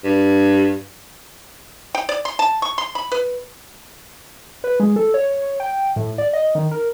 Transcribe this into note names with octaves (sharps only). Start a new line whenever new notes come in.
G2
G5
D5
C6
A5
C#6
C6
B5
B4
B4
G#3
A4
C#5
G5
A2
D5
D#5
D#3
A#4